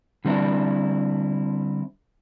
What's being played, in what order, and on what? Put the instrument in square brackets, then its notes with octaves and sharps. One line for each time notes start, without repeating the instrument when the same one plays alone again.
[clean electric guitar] D3 G3 C4 D4 E4